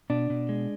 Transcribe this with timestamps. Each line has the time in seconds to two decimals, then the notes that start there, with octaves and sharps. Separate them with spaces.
0.10 B2 D4
0.30 B2
0.49 G#3